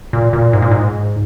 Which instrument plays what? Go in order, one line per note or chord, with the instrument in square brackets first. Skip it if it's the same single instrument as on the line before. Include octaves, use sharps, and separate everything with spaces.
[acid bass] A#2
A#2
G#2
A#2
G#2